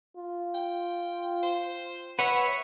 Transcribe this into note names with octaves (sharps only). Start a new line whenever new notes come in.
F4
G5
C5
B4 C#5 E5 F#5